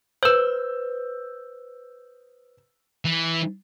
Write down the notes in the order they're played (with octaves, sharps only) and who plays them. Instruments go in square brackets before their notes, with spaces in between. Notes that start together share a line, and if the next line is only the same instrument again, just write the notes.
[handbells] B4 C5 [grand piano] E6 G6
[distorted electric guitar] E3